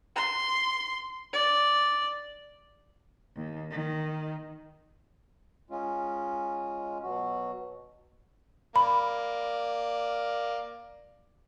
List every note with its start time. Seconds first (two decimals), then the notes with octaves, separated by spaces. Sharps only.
0.16 C6
1.33 D5
3.36 D#2
3.71 D#3
5.71 G#3 C#4 F4
7.03 B2 F#3 F#4
8.76 A#3 D5 B5